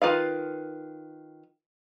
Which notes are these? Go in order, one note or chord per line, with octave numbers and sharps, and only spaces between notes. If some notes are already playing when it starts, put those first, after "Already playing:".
D#3 F4 B4 F5